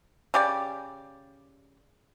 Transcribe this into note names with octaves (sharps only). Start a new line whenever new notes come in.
C#3 G4 D5